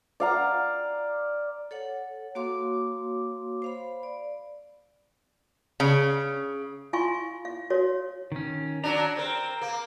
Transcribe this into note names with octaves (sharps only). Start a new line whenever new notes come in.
D5 F5 A#5
A4 C#5 F#5
A#3 F#4 C#5 F5 C6 D6
C5 F5 B5
D5
C#3
E4 F4 F5 G#5 C6 C#6
F5
F#4 C#5
D#3 C#4
F#3 D4 A#5
C4 A#4
A#3